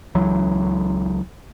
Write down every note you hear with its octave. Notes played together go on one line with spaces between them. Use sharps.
C#2 E3 F#3